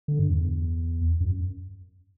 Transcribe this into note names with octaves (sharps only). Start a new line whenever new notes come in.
D3
G2
E2
F#2